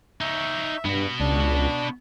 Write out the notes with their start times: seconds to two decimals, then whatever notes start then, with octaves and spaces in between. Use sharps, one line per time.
0.21 D#4 C#5 E5
0.85 G2 B3 F#4
1.20 C#2 D4